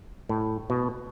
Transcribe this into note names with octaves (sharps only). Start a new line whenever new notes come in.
A2
B2